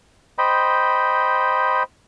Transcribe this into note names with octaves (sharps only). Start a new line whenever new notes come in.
C5 D#5 G5 B5